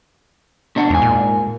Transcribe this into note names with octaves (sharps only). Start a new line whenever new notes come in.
B2 D4 F#5
E2 G#2 G#5
A#2